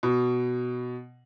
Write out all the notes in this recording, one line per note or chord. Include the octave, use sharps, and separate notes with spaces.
B2